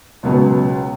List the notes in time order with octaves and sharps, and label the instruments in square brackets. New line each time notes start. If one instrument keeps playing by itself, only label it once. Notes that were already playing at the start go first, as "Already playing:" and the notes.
[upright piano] C#2 B2 F#3 B3